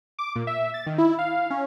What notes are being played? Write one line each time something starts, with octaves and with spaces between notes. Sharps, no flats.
D6
A#2
E5
A6
D#3
E4
F5
C#4